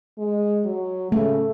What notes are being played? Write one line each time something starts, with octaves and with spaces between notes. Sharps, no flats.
G#3
F#3
C#3 A3